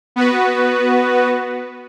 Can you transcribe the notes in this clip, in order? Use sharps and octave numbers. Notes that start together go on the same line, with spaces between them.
B3 F#4 B4